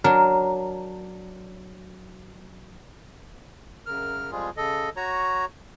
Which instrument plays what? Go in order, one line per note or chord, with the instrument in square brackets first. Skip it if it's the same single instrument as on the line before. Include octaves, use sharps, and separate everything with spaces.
[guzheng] F#3 D4 A#4
[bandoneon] F#2 C#3 A#4 F6
F2 F3 G3 G#3 F4 G#4
C#3 A4 D#5
F#4 C#5 A#5